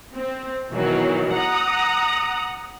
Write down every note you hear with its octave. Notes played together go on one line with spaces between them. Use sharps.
C4
B2 D#3 E3 F#3
F#5 A#5 D#6